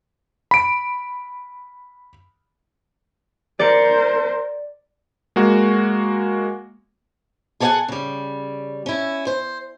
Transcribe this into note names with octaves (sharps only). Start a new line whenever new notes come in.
B5 D7
A#4 C5 D5 C#7
G#3 A#3 F#4
G#4 A4 C#5 F5 F#5 G#5
C#3 G3
C#4 E4
C5